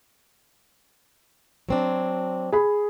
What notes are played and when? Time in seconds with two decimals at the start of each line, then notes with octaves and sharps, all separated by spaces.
1.69 F#3 C4 D4
2.52 G#4 B5